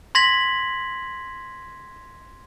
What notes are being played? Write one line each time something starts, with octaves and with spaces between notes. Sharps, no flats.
C6 G#6 A#6 B6 F#7